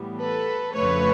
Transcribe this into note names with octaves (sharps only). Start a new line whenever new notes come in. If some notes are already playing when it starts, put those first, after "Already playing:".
Already playing: A2 E3 G3 B3
A4 B4
F2 C#3 F3 A3 B4 C#5